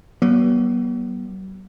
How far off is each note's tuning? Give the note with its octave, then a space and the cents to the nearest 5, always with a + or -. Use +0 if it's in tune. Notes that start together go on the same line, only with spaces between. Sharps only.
F#3 +45 B3 -40